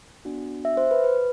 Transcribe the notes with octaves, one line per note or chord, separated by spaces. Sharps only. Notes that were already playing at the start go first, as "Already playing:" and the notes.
B3 D4 F#4
E5
C5
B4
B4